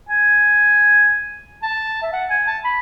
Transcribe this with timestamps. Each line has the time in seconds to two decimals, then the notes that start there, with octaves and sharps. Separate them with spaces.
0.09 G#5
1.62 A5
2.02 E5
2.13 F#5
2.30 G#5
2.47 A5
2.64 B5